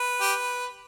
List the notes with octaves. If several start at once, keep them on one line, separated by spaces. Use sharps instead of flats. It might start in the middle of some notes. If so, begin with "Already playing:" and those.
Already playing: B4
G4